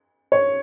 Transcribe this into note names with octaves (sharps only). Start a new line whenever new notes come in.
C#5